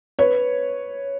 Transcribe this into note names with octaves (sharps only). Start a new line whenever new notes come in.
B4 C#5